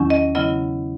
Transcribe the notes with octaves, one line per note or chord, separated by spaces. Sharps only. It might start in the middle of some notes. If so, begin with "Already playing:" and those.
Already playing: E2 D#3 F#3 C#4 E4
D#5
C#3 F#3 B3 E4 D#5